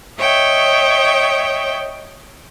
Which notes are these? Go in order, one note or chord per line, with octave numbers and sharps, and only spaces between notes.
C#5 D#5 E5 G5